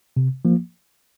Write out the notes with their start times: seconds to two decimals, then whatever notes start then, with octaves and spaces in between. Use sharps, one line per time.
0.16 C3
0.45 F3 A#3